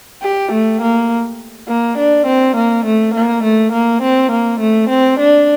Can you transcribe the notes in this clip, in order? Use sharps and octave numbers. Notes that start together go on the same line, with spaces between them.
G4
A3
A#3
A#3
D4
C4
A#3
A3
A#3
A3
A#3
C4
A#3
A3
C4
D4